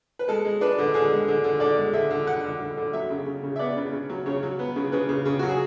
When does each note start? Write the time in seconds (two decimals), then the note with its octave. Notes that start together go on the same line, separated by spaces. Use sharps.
0.19 B4
0.28 G#3 A4
0.45 G#3
0.61 D4 B4
0.78 D3
0.94 D3 G#4
1.11 G#3
1.28 D3
1.44 D3
1.60 D3 D5
1.77 G#3
1.93 D3 E5
2.11 D3
2.26 D3 F#5
2.44 D3
2.60 D3
2.77 D3
2.93 F#3 E5
3.10 C#3
3.26 C#3
3.43 C#3
3.56 E5
3.59 B3 D5
3.77 C#3
3.92 C#3
4.09 F#3
4.26 C#3 C#5
4.43 F#3
4.59 B3
4.76 C#3
4.92 C#3 B4
5.09 C#3
5.25 C#3
5.39 F#3 F#4
5.48 G#4